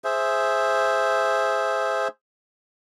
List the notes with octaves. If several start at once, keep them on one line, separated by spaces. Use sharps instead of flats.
G#4 C5 E5